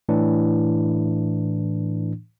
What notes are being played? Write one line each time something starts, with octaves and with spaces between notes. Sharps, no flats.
A2 E3 D4